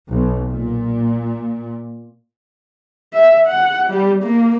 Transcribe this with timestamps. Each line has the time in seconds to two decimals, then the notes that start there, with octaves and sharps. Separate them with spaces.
0.11 B1
0.50 A#2
3.13 E5
3.47 F#5
3.89 G3
4.23 A#3